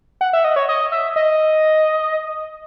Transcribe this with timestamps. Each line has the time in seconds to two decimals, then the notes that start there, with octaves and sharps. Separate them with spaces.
0.21 F#5
0.33 E5
0.44 D#5
0.56 C#5
0.69 D#5
0.92 E5
1.16 D#5